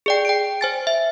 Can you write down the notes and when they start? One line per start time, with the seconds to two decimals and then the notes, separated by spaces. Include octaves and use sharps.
0.06 G#4 D5 G5
0.25 G5 D7
0.61 C5 G#5 A6
0.87 E5